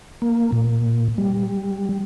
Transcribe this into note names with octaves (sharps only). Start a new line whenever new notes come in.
A#3
A#2
G3